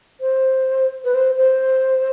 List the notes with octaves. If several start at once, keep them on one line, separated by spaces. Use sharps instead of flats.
C5
B4
C5
C5